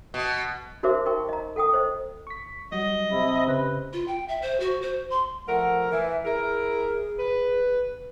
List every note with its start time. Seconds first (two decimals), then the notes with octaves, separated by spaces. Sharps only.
0.14 B2
0.83 D#4 F#4 A#4 C5 E5 D6
1.06 D#4 F#4 A#4 G5 C#6
1.29 D#5 A#5
1.56 A4 F#5 G5 D#6
1.74 C5 D#5
2.27 C#6 B6
2.72 F#3 G3 F#4 D#5
3.12 C3 E4
3.47 C#3 B4 C5
3.93 F4
4.08 G5
4.28 E5
4.42 C5
4.60 F#4
4.82 C5
5.10 C6
5.48 F3 A3 A#4 F#5
5.92 E3 E5
6.25 E4 G#4 A#4
7.18 B4